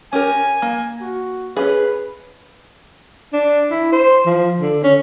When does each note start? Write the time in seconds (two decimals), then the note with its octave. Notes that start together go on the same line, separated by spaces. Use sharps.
0.13 C#4 G4 A#4 G#5
0.62 A#3
1.01 F#4
1.57 C#4 G#4 B4
3.33 D4
3.71 E4
3.92 C5
4.26 F3
4.60 D3
4.83 C#4